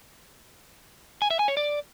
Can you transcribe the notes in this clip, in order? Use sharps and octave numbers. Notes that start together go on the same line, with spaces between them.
G#5
E5
G#5
C#5
D5